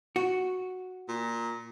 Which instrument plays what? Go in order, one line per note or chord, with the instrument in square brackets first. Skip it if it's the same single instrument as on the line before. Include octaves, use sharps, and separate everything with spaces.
[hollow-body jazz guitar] F#4
[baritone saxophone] A#2